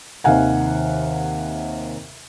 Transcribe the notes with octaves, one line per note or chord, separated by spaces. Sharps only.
D#2 C3 D#3 F5 F#5 G#5